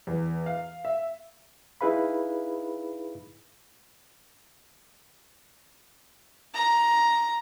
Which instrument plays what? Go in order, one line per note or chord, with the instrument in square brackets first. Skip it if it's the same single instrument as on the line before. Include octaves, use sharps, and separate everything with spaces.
[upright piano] E2
F5
E5
[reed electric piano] D#4 E4 G#4 B4 F5 B5
[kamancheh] A#5